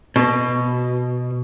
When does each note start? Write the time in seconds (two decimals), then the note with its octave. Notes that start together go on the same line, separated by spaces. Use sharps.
0.16 B2